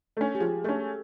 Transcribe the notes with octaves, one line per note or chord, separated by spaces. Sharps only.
A3 C#4
G4
F3 G#4
A3 C#4 A4